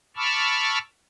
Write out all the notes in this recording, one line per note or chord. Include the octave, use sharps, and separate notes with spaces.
A5 B5 C#6 D6 E6 F6